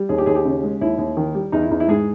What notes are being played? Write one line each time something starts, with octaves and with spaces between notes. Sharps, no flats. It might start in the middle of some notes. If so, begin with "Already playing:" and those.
Already playing: G3
D#2 G#4
G4
D#2 G#4
G4
C#3
G#3
D#2 E4
D#2
D#3
G3
E2 D#4
E4
E2 D#4
E4
G#2 G#4